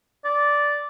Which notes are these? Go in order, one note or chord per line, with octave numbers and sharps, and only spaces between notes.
D5